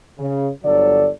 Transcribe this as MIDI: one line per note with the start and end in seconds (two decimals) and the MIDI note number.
0.19 0.49 49
0.64 1.09 31
0.64 1.09 50
0.64 1.09 54
0.64 1.09 69
0.64 1.09 73
0.64 1.09 74